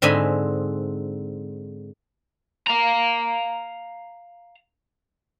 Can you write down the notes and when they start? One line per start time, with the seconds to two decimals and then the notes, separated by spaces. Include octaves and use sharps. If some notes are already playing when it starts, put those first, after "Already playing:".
0.02 G#2 D3 C4 D#5 G#5 B5
2.67 F5 A#5